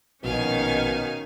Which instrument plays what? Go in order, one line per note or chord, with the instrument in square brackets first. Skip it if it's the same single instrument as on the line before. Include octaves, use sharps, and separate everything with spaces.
[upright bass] A#1 [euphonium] B2 [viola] D#3 C#4 [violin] F5 G#5